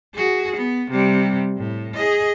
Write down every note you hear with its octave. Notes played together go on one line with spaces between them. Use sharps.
F#4 G#4
B3
C3 G3
A2
G#4 D#5